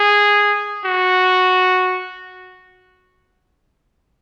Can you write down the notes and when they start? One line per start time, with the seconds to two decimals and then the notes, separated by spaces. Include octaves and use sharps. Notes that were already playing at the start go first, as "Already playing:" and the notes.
Already playing: G#4
0.85 F#4